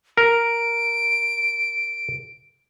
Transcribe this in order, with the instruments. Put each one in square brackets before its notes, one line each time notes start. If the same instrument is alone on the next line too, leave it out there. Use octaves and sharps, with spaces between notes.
[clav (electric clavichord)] A#4 [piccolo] D7